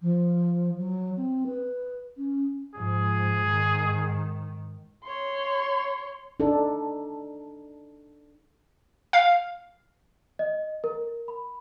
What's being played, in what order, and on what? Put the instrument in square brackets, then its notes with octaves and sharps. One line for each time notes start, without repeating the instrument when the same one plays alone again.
[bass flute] F3
F#3
C4
B4
C#4
[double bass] G#2 F3 [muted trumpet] G#4
[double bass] G#2 D#3
[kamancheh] C#5 C6
[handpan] D4 D#4 A4
[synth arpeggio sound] F5
[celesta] D#5
A#4
B5